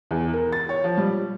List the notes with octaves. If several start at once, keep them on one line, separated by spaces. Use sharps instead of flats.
E2
A#4
A6
C#5
F3
G3